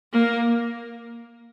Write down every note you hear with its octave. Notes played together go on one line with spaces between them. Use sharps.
A#3